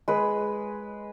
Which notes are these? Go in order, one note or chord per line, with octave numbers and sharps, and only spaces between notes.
G#3 B4